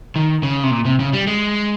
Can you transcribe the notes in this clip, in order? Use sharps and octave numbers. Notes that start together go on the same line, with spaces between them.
D#3
C#3
C3
A#2
C3
C#3
G3
G#3